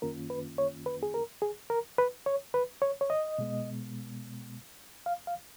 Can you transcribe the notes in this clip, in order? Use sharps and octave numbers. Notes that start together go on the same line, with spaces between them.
F#2 D#3 A#3 C#4 F4 A#4
B4
C#5
B4
G#4
A#4
G#4
A#4
B4
C#5
B4
C#5
C#5
D#5
B2 G#3 B3
F5
F5